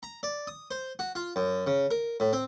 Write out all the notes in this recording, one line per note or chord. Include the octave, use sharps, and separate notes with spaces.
A#5
D5
D#6
C5
F#4
F4
F#2
C#3
A#4
A2
C4